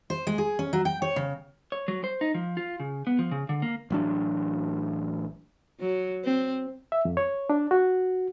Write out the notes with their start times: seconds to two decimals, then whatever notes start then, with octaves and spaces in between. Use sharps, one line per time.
0.10 C5
0.27 G#3
0.38 G#4
0.59 C#4
0.73 F#3
0.85 G5
1.02 C#5
1.16 C#3
1.72 C#5
1.88 F#3
2.04 C5
2.21 D#4
2.35 F3
2.57 F4
2.80 C#3
3.07 B3
3.19 F3
3.31 C#3
3.49 D3
3.62 A#3
3.90 A1 F#3 D4
5.80 F#3
6.25 C4
6.92 E5
7.05 F2
7.17 C#5
7.50 D4
7.71 F#4